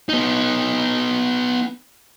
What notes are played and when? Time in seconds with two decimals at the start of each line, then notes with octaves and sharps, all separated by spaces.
0.09 B3 D#4